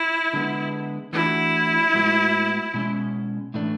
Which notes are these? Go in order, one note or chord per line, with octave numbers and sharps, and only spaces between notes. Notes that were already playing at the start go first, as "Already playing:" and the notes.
Already playing: E4
D3 G#3 B3
E3 A3 D4 E4 F#4
A2 G#3 B3 F#4
B2 G#3 C#4
A2 E3 A3 D4